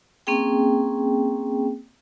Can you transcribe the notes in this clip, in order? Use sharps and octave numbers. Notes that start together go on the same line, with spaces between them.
A#3 C4 C#4 G#4 G5